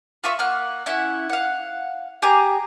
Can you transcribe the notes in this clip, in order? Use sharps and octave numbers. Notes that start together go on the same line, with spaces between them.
F4 E5 B5 C#6
A#3 F#5 F6
C#4 E4 F#5
F5 F#5
G4 G#4 A#5